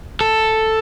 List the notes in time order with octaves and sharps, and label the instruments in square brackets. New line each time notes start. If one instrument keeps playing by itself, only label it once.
[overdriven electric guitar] A4